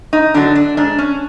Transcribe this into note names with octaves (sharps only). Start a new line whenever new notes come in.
D#4
D3 F#3 D4
D4
G#2 D4
C#4